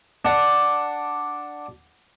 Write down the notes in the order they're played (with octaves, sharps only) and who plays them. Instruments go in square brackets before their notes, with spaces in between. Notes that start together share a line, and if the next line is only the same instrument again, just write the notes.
[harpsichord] D4 F#5